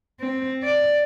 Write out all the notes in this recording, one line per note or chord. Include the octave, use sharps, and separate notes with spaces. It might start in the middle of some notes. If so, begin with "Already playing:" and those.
C4
D5